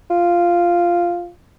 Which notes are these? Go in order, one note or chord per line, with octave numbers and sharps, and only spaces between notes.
F4